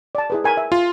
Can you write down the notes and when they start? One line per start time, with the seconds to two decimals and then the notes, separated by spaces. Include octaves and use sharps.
0.15 D5 A5
0.30 E4 G#4 B4
0.44 A#4 G#5 B5
0.57 E5
0.72 F4